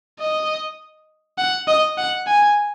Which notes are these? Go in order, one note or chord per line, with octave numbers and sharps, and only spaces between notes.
D#5
F#5
D#5
F#5
G#5